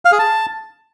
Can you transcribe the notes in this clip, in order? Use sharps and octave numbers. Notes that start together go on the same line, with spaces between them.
F5
G#4
A5